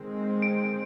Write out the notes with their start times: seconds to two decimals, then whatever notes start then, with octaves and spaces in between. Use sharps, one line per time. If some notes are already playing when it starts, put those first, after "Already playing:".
Already playing: D#3 G#3 C4
0.42 D7